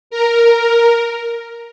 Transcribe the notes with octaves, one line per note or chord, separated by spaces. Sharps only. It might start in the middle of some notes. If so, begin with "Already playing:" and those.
A#4